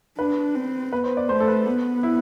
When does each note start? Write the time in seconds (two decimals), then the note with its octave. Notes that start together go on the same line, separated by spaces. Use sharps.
0.18 D4 B4
0.55 C4
0.92 B3 B4
1.04 C5
1.17 D5
1.29 A3 C5
1.40 A4
1.48 B4
1.66 B3
2.03 E4